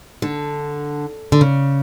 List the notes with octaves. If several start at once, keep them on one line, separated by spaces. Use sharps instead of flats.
D3
D3
C#3